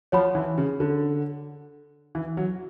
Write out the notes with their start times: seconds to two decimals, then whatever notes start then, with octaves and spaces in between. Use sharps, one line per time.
0.12 F3 C#5 F#5 B5
0.35 E3
0.58 C#3
0.80 D3
2.15 E3
2.37 F#3